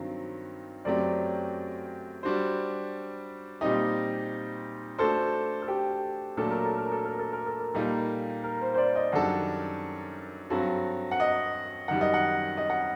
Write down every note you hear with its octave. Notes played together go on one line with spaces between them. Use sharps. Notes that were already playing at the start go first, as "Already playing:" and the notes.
Already playing: G2 D#3 F#3 C4
F#2 F#3 A3 C4 G4 D5
G3 D4 F#4 C5
A#2 G3 C4 D#4 G4 D#5
A3 D4 F#4 A4 C5
A4
G4
A#2 F#3 A3 D4 A4
A#4
A4
A#4
A4
A#4
A4
A#4
A4
A#4
A#2 G3 A#3 D#4 A4
A#4
C5
C5
D5
D#5
F#2 D#3 G3 D4 A4 F#5
G2 F#3 C4 F#4 A4
F#5
D#5
F#2 D#3 G3 F#5
D#5
F#5
D#5
F#5